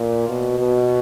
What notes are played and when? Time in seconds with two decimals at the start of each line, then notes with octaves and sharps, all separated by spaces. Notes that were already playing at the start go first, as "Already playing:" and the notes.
Already playing: A#2
0.29 B2
0.59 B2